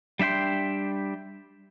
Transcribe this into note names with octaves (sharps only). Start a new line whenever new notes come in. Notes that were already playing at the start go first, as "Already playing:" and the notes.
G3 D4 E5 G5 C6